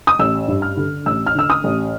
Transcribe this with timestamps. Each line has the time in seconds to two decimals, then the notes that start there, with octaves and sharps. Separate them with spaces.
0.07 D#6
0.19 A1 E6
0.48 G2
0.62 F6
0.77 D3
1.06 A1 E6
1.26 F6
1.35 D3 E6
1.50 D#6
1.64 A1